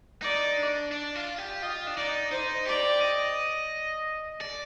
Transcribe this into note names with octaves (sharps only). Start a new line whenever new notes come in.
D#4 D5
D4
D4
F4
G4
F4 D#5
D4
D#4 D5
D#4 C5
G4 D5
D#5
D5